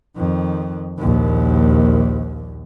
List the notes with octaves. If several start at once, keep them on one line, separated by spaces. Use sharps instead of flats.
F2 D#3
A#1 D#2